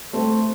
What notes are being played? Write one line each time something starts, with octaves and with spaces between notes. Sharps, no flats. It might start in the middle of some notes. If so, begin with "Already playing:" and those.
A3 C4